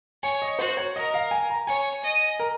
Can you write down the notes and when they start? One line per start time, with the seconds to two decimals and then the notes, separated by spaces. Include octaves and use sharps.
0.23 C#5 G#5
0.42 D#5
0.59 F#4 C5
0.77 C#5
0.95 A#4 D#5
1.14 F5
1.31 G#5
1.50 A#5
1.67 C#5 G#5
2.03 D#5
2.39 A#4